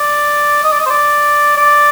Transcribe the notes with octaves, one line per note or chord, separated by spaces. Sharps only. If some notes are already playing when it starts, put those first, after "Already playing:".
Already playing: D5
D#5
D5
D#5
C5
D5
D5